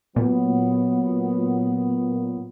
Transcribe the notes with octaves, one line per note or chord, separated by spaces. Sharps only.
A#2 F#3 B3